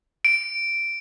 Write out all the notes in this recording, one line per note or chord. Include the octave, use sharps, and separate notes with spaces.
D7